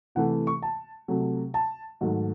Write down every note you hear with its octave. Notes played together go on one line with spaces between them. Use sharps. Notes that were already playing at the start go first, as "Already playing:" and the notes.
C3 E3 A3 F#5
C#6
A5
C3 F#3 A3
A5
G#2 D#3 F#3 A3